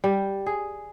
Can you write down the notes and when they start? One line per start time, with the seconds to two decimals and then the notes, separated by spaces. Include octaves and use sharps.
0.04 G3
0.46 G#4